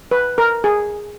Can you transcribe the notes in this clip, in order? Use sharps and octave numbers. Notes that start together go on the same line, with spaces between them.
B4
A#4
G#4